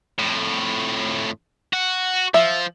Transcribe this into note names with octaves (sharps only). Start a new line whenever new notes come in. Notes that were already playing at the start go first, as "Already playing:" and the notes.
F2 A2
F#4
F3 E5